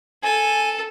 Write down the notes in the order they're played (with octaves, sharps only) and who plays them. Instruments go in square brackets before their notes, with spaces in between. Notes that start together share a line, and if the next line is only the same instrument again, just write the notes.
[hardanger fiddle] A4 [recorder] G#5